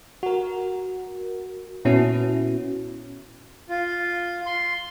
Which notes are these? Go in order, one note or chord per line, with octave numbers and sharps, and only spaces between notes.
F#4 A#4
A#2 B3 C#4 E4 F#4
F4
C6